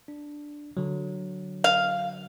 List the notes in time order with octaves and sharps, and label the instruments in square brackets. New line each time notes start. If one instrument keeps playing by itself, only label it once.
[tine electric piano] D4
D3 F#3
[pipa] F5